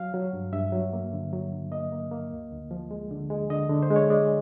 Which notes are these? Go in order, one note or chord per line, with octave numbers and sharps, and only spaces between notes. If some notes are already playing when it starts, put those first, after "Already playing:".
Already playing: F#3 F5
F#3
G2
G2 E5
F#3
A#3
D3
F#3
D3
A#3 D#5
A#3
A#3
D2
D2
F3
G#3
D3
G#3
D3 D#5
D3
C5
G#3
C#5
G#3 D5